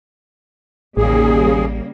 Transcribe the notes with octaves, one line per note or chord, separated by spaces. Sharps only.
A1 D#2 C#3 G3 A#3 G#4